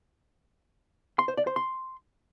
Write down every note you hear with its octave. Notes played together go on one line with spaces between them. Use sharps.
C6
C5
D5
C5
C6